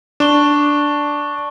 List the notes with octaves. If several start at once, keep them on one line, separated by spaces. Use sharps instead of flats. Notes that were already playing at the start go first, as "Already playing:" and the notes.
D4 A5 C#6 G7